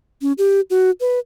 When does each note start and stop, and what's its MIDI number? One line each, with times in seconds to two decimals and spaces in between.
0.22 0.32 61
0.38 0.61 67
0.70 0.90 66
1.01 1.19 71